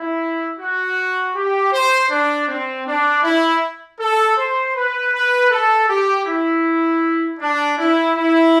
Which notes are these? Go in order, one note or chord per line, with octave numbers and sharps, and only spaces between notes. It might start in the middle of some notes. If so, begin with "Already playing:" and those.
Already playing: E4
F#4
G4
C5
D4
C4
D4
E4
A4
C5
B4
B4
A4
G4
E4
D4
E4
E4